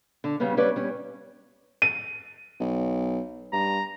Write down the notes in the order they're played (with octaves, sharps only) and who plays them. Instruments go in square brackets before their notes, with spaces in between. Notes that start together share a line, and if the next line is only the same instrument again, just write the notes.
[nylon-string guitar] D3
C#3 G3 B3 C#4
G3 C#4 B4 D5
G3 C#4
[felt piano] D#7
[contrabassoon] B1
[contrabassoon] G2 [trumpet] A#5